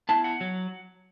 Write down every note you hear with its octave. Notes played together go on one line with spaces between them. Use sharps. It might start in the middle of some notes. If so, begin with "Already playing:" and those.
B3 E4 A5
F#5
F#3